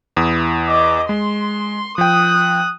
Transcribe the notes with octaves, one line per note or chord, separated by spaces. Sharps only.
E2 E4 D#6
D#5 D6
G#3 C6
F3 G5 D#6 F#6